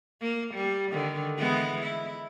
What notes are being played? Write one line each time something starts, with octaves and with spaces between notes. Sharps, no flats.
A#3
G3
D3 D#3
E3 G#3 B3
E4